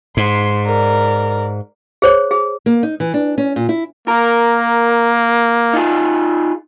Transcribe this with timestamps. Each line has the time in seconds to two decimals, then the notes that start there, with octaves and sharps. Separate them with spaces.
0.17 G#2 C6
0.67 A#4 D5
2.02 G#4 C5 C#5
2.31 G#4
2.66 A#3
2.83 D#4
3.00 E3
3.14 D4
3.38 C#4
3.56 A#2
3.69 E4
4.08 A#3 A#4
5.73 D#4 F4 G#4